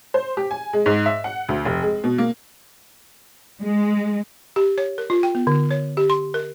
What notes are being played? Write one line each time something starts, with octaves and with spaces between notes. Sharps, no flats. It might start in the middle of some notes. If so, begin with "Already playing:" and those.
C5
G4
G#5
G#3
G#2
E5
F#5
D2
F1
G#3
B2
A#3
G#3
G4
C#5
A#4
F4
G5
B3
D3
C#5
G4
C6
A#4